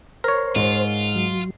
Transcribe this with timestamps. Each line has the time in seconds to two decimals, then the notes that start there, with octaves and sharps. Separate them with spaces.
0.24 A#4 C5 C#5
0.56 G#2 F4
1.16 F#3